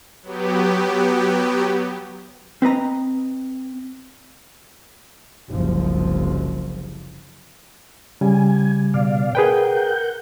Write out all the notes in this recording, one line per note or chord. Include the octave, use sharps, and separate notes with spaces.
F#3 B3 G4
C4 B4 D#5 A#5
F#1 C2 F3
C#3 G3 G#5
B2 D5 F5
G#4 A#4 B4 F#5 G5 G6